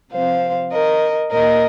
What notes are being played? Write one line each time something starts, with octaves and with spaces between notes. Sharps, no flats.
C3 F3 C4 C5 F5
A#4 D#5
A#2 A#3 A#4 D#5